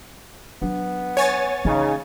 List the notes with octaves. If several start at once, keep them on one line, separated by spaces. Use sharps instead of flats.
F#3 B3 D4
C#5 G#5 A6
C#3 E3 A#3 D#4